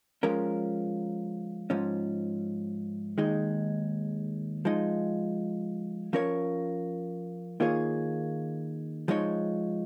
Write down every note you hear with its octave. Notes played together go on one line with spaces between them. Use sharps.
F3 G#3 C#4 A#4
G#2 F3 C#4
D#2 D#3 G#3 D#4 G#4
F3 G#3 D#4
F3 C#4 A#4 C#5
D#3 A#3 F4 G#4 C#5
F3 G#3 D#4 C#5